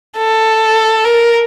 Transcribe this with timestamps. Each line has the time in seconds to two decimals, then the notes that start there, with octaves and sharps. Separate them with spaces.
0.18 A4
1.05 A#4